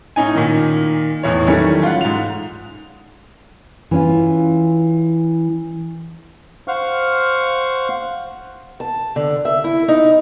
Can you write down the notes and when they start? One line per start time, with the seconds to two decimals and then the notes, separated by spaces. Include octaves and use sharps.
0.16 A2 C#4 D#4 G#5
0.35 A#2 D#3
1.23 E2 A2 C#5
1.47 D#3 E3 F#3 G3 A3 C#4
1.83 F4 F#5
2.01 G#2 F7
3.91 E3 C#4 F4
6.68 C5 F5 F#5 C#6 F6
8.80 A5
9.16 D3
9.45 E5
9.64 E4
9.88 D#4